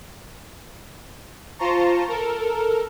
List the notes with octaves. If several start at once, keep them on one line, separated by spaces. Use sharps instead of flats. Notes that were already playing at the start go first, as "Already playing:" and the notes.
F4 C5 A5 A#5 C#6
A4 A#4